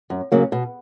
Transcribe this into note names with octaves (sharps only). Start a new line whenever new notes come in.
F#2
C#3 F#3 A#3
B2